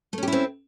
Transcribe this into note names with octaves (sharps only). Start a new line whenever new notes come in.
A3 C4 C#4 E4 G4